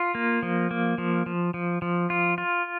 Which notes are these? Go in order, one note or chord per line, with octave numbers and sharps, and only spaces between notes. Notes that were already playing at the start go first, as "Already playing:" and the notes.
Already playing: F4
A#3
F3
A#3
F3
F3
F3
F3
F4
F4